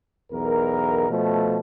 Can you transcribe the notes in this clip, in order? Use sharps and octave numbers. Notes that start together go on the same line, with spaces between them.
B1 E2 A#4
B2 F3 A3